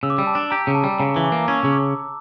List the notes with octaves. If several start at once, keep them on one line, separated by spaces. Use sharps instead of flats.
C#3 E6
D6
G3 E6
A5
D4
G4 A#5
C#3
A5
G3
C#3 A#5
E3
D6
A#3
C#4 E6
C#3
D6